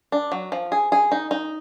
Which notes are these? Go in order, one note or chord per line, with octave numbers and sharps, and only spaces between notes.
D4
F#3
F3
G#4
G#4
D#4
D#4